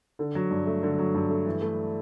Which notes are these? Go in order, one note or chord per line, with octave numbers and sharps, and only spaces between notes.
D3
F#3
G2
A3
D3
F#3
G2
A3
E3
A3